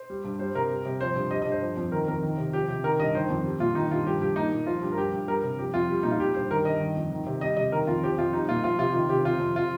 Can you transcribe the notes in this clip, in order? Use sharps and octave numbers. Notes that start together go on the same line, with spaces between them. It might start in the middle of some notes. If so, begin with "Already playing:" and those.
Already playing: C5
G3
G2
G3 C5
C3 A#4
G3
C3
F3 C5
G2
G3 D#5
D#5
G2
C5
F3
F2
D#3 A#4
F2 A#4
D#3
C3
F3 G4
C3 G4
D#3 A#4
G2 D#5
D#3 C5
F2
G3
A#2 F4
D#3 D#4
G2 F4
F3 G4
G2 G4
A#3 D#4
A#2
F3 F4
G2
A#4
F3 G4
G2
G3 A#4
C3
F3 G4
F2 F4
G3
A#2 D#4
F4
G3 G4
G2 C5
D#3 A#4
G2 D#5
D#3
F2
D#3
C3
G3 D#5
C3 D#5
D#3 A#4
F2 F4
F3 G4
F2 F4
G3 D#4
A#2 F4
F3 F4
C3 F4
D#3 F4
C3 G4
C3 F4
F2
F3 F4